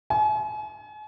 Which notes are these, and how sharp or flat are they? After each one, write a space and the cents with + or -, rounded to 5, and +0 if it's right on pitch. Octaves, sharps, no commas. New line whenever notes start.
G#5 +40